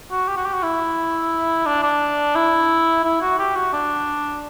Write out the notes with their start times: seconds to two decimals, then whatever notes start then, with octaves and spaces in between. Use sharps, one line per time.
0.11 F#4
0.28 G4
0.37 F#4
0.46 G4
0.54 F#4
0.63 E4
1.66 D4
1.83 D4
2.35 E4
3.04 E4
3.21 F#4
3.39 G4
3.56 F#4
3.73 D4